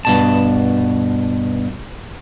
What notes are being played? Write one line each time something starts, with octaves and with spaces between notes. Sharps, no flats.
G2 B2 A5